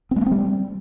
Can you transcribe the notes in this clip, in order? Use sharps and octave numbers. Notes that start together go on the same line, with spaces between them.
C4
G#3
A3
C4
G3